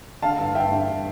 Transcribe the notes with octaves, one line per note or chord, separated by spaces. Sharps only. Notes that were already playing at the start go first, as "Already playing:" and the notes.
D3 F5 A5
G2
G2 E5 G5
G2